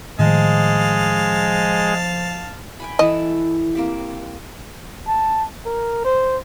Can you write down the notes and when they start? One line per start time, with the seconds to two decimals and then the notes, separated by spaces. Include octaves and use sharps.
0.19 A2 D#3 F3 G#3 G#4 D#5 F5 A5
2.80 G5 G#5 B5
2.99 E3 E4 A4 D#5
3.75 A#3 C4 G4
5.07 A5
5.66 A#4
6.04 C5